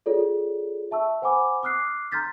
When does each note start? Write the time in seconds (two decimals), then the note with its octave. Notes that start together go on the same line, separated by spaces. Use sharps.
0.06 F4 G#4 A4 C#5 D5
0.91 E5 A5 C#6 E6
1.22 C5 F#5 G#5 B5 D6
1.63 D6 D#6 F6 F#6 C7
2.12 A#5 C6 F6 G6 A6 B6